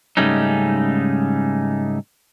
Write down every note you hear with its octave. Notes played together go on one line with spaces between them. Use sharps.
G#2 C#3 G3 A3 C#4 D#4